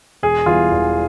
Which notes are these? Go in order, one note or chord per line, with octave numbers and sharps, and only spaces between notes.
E1 G#4
E2 E3 G3 F4
E1